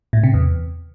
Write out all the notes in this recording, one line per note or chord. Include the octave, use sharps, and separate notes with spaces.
A2
C3
E2